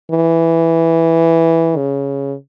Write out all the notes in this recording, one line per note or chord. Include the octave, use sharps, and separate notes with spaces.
E3
C#3